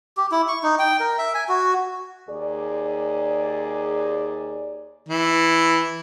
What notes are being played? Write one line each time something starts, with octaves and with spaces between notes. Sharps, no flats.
G4
E4
C#6
D#4
G5
A#4
E5
G#5
F#4
D#2 G#4 D5
E3